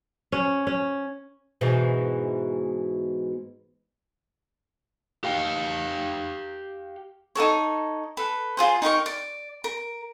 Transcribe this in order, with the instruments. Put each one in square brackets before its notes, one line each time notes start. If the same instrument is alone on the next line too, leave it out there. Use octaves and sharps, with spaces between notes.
[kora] C#4
C#4
[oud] G#2 B2 E3
[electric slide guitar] G4 F5 G5
[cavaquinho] D#4 F#4 A4 C#5
A4 B4
F4 G#4 C5
D#4 G4 A#4 C#6
D5
A#4